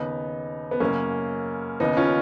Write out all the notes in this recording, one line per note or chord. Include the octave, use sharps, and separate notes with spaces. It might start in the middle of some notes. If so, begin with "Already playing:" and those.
Already playing: D#2 C#3 B3 D#4
B3
F#2 C#3 A#3 C#4
D#2 C#3 B3 D#4
C#4 F4